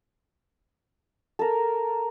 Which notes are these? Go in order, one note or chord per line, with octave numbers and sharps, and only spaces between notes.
A4 A#4